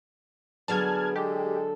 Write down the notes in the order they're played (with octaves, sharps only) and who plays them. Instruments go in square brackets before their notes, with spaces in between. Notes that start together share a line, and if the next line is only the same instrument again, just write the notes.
[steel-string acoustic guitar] D3 F#3 D5 [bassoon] B3 [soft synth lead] G#4 [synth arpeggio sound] A5 F6 G#6
[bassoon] G#3 [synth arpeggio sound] G4 [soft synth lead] A4